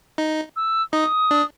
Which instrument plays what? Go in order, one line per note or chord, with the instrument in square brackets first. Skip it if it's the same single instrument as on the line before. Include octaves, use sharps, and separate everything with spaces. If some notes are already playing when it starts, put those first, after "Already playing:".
[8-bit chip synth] D#4
[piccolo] E6
[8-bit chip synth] D#4 [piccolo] D#6
[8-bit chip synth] D4